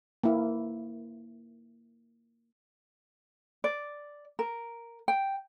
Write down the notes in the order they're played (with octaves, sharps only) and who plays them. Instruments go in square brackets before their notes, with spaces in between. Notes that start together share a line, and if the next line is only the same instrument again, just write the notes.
[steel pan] A#3 E4
[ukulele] D5
A#4
G5